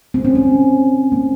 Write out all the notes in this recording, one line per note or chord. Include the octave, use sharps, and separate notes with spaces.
C4
C#4
C4
A#3